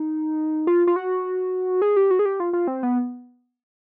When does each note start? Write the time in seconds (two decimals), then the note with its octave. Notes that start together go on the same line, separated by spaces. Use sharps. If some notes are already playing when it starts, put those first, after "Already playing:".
Already playing: D#4
0.67 F4
0.87 F4
0.96 F#4
1.82 G#4
1.96 G4
2.11 F#4
2.19 G#4
2.25 G4
2.40 F4
2.53 F4
2.68 C4
2.83 B3